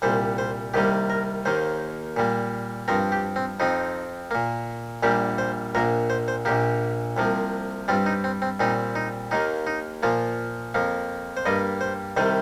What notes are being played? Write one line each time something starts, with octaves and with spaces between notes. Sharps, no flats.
C2 A#2 G3 C5
C5
C2 C3 D#3 G3 A#3 G4
A#4
D#2 D#3 A#3 C5
A#2 G3 A#3
G2 F3 C4 A#4
G4
C4
F2 F3 C4 D#4
A#2 A#3
A#1 A#2 G3 A#3 G4
C5
A#1 A#2 A#3 A#4
C5
C5
A#1 A#2 A#3 G4
C2 C3 F3 A#3
G2 G3 C4 F4
D#4
C4
C4
A#2 G3 C4 D#4
D#4
D#2 D#3 A#3 D#4
D#4
A#2 F3 A#3 F4
F2 F3 A#3
C5
G2 G3 A#3 D#5
C5
C2 C3 D#3 G3 C5